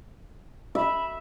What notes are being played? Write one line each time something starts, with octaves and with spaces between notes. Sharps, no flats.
E5 B5